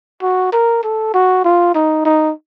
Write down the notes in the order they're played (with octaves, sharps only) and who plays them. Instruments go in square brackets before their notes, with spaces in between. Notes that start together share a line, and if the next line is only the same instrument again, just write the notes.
[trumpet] F#4
A#4
A4
F#4
F4
D#4
D#4